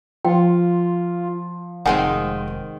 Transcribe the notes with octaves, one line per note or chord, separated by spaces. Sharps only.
F3 F4 G5
F1 D#3 G#3 C4 F#5 G#5